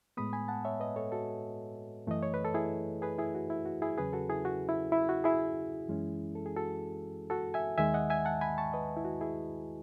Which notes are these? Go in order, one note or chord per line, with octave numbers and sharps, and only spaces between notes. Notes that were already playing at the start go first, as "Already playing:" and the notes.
A2 G#3 B3 B5 D#6
G#5 B5
F#5 A5
C#5 E5
B4 D#5
A4 C#5
F#4 A4
F#2 E3 A3 D#5
C#5
B4
A4
E4 G#4
G#4 B4
E4 G#4
F#4
E4
F#4
E4 G#4
E2 C#3 F#3 C#4 G#4 B4
F#4 A4
E4 G#4
F#4
E4
E4
F#4
E4 G#4
F#2 E3 G#3 C#4
A4
G#4
F#4 A4
F#4 A4
E5 G#5
D#2 D#3 G#3 E5 G#5
D#5 F#5
E5 G#5
F#5 A5
G#5 B5
A5 C#6
B4 D#5
E4
F#4
E4 G#4